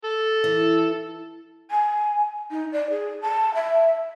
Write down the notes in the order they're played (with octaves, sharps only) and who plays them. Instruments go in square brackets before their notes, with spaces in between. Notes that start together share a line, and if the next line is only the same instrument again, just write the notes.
[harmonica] A4
[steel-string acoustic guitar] E3
[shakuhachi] G#5
D#4
D5
G#4
A5
E5